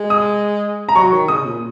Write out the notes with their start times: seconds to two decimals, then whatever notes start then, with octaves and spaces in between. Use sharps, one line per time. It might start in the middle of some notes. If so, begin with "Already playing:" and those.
Already playing: G#3
0.10 D#6
0.89 A#5
0.95 F#3 C#6
1.12 D#3
1.28 C#3 D#6
1.46 A#2